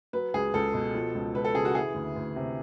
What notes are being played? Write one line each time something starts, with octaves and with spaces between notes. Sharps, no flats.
F#3 B4
C#2 G#4
C#2 A4
B2
F3
C#2
C#2 B4
A4
C#3 G#4
F#4
E3 G#4
D2
D2
C3